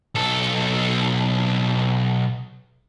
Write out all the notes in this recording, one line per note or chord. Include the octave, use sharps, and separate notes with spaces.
B1 A4